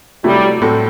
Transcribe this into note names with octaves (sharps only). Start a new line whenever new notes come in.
C3 F#3 G3 A3 E4
A2 F#3 C4 F#4 A4